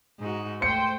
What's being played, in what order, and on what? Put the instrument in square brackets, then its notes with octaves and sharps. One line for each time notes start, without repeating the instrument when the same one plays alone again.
[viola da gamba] G#2 D#4 F#4
[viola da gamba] A3 [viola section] C5 G5 [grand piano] C#7